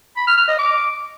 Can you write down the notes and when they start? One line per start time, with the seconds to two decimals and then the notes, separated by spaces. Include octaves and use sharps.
0.17 B5
0.27 F6
0.38 F6
0.48 D#5
0.59 D6